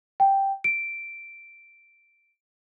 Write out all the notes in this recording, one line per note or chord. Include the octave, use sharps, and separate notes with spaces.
G5
D7